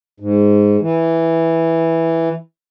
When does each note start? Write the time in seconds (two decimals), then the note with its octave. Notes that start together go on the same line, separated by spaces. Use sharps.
0.20 G#2
0.81 E3